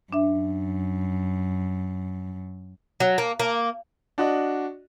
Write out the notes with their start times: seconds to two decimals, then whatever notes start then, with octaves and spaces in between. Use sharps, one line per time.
0.13 F#2 D4 E5
3.00 F#3
3.18 A#3
3.40 A#3
4.18 D4 F#4 D#5